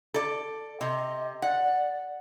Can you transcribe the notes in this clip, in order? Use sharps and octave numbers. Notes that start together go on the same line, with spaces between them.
A4 D5
C3 D#5
D5 F#5
D5